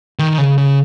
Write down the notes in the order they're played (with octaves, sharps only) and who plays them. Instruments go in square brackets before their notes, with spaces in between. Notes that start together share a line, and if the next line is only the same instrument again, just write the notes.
[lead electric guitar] D#3
C#3
C#3